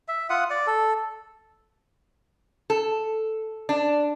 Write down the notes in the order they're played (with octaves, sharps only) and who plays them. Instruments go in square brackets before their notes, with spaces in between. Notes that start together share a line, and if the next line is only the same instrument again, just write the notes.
[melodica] E5
F4 F#5 D#6
D5
A4
[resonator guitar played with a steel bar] A4
D4